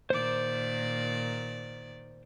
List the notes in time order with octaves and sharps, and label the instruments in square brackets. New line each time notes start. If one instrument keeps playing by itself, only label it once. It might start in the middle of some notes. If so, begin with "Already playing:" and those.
[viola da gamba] A#2 D#3 D5 [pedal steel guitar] C5 D6